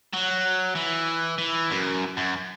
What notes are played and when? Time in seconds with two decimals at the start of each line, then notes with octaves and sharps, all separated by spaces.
0.14 F#3
0.75 E3
1.38 E3
1.70 F#2
2.17 F#2